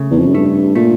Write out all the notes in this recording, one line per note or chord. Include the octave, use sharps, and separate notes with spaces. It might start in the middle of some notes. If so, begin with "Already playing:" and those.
Already playing: C#3 A3
E2
F2
F#2
G2 A3
A#2 A3